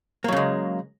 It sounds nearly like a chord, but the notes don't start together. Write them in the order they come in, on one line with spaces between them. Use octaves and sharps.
A#3 F#3 C#3 G#3